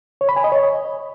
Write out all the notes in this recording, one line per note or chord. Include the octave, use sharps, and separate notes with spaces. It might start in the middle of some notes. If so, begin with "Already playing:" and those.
C#5
B5
G#5
D#5
C#5